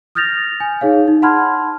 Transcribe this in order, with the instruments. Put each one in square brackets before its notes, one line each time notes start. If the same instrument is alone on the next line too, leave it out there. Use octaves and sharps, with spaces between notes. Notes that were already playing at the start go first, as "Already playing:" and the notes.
[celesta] D#6 F6 G6 A6 A#6 F7
G#5
D#4 G#4 C#5 F5
D#4
F#5 A5 B5 C6 F6 G#6